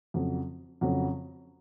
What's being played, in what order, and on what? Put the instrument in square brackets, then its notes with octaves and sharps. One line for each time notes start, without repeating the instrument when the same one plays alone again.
[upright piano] F2 C#3 F#3
F2 C#3 F#3